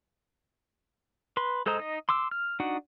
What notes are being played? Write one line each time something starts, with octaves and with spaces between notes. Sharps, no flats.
B4 C6
G#3 A4 C5 D#5 A#5
D#4 D#5
C6 D6 E6
F6
D4 D#4 F#4 F#5